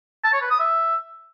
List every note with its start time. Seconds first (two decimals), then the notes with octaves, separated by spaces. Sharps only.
0.24 A5
0.33 C#5
0.42 B4
0.51 D#6
0.60 E5